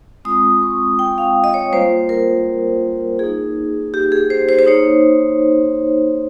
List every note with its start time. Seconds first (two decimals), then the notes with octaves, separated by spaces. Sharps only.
0.25 G#3 C4 F4 D#6
0.63 C#6
0.99 G5
1.18 F5
1.44 D#5
1.54 C#5
1.72 G3 A#3 F4 C5
2.09 A#4
3.19 A#3 D#4 G#4
3.94 G4
4.12 G#4
4.30 C5
4.49 C5
4.59 C5
4.67 A#3 D#4 C#5